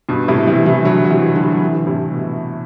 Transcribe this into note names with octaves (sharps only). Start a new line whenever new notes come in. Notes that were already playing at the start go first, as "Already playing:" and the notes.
G2 B2
A2 C3
C3 E3
C3 E3
D3 F#3
F#3
C3 E3
D3 F#3
F#3
C3 E3
D3
A2 C3
B2